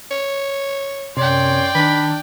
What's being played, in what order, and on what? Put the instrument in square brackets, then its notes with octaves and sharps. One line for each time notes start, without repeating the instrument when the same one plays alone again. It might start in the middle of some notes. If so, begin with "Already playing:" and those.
[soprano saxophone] C#5
[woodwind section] F#2 C#5 C6 [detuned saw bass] C3 [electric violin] D5 G5
[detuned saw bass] D#3 [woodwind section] D4 [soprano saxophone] B5